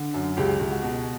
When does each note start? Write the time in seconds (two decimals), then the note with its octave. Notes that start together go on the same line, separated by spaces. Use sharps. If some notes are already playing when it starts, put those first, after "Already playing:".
Already playing: D3
0.14 F#2
0.37 C#2 G4
0.59 C#2
0.71 F#4
0.82 B2